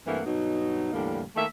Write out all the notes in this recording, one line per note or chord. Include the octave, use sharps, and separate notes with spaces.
G2 E3 A3 A#3 C4 F#5
G2 B2 F#3 D#4
E2 A2 D3 G3 A#3 D4
D#3 A3 A#3 E5